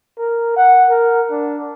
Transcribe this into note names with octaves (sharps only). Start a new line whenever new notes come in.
A#4
F#5
A#4
D4